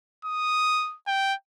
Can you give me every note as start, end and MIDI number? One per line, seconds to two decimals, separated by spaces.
0.25 0.96 87
1.07 1.34 79